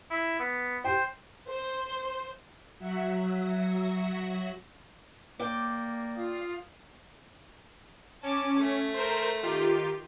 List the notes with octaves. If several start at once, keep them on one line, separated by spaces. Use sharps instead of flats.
E4
B3
C5 G5
C5
F#3 F#4 E5 F#5
A#3 D5 G5
F4 F5 D#6
C#4 A5 D6
A3
A#4 C5
D#3 F4 G4